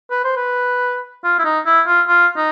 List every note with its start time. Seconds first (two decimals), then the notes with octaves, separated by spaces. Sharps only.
0.11 B4
0.25 C5
0.36 B4
1.24 F4
1.39 E4
1.45 D#4
1.66 E4
1.87 F4
2.08 F4
2.37 D#4